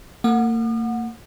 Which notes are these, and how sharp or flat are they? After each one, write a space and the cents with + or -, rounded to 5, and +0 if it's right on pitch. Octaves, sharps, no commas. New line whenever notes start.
A#3 -40 F#5 -20 D#6 -45